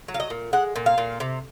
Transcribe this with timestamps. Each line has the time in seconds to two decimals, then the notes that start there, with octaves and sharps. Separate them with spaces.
0.08 F#3
0.14 F5
0.20 D#5
0.30 A#2
0.53 G#3 F#5
0.76 A#2
0.86 F5
0.98 A#2
1.20 C3